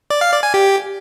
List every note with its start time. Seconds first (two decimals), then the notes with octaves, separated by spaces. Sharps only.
0.10 D5
0.21 F5
0.32 D5
0.43 G#5
0.54 G4